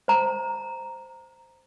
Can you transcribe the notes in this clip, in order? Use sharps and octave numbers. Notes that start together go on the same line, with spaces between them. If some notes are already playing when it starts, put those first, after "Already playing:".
C5 A#5